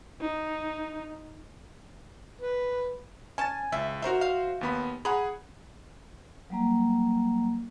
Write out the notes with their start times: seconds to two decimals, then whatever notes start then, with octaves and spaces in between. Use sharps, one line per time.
0.21 D#4
2.41 B4
3.38 C#4 G#5 A5 A6
3.72 C#2 E5
4.02 F#3 D#4 F#4 A#4 C5 E5
4.21 F5
4.61 D#2 B3 B5
5.05 G#4 F#5 A#5 B5
6.50 F#3 G3 A#3 A#5